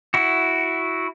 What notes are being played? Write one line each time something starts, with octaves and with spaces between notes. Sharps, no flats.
E4 F#4